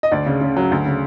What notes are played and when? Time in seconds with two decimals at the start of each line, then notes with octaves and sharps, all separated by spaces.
0.03 D#5
0.11 D2 D5
0.26 C#3
0.41 C#3
0.56 F#3
0.71 D2
0.86 C#3